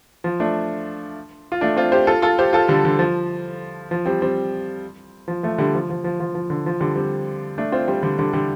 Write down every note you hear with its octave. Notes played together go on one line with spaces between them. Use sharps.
F3
A3 D4
F4
A3 D4
C4 F4
G4 C5
F4 A4
F4 A4
G4 C5
F4 A4
D3 G3
D3
F3
F3
G3 C4
G3 C4
F3
F3 A3
D3 G3
F3
F3
F3
F3
F3
D3
F3
D3 G3
G3 C4
A3 D4
C4 F4
G3 C4
D3 G3
D3 G3
D3 G3